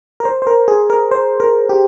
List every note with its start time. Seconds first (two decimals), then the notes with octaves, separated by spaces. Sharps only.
0.20 A#4
0.25 C5
0.42 C5
0.47 A#4
0.68 G#4
0.90 A#4
1.11 C5
1.40 A#4
1.69 G4